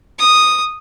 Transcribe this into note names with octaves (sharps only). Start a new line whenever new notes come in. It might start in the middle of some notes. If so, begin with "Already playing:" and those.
D#6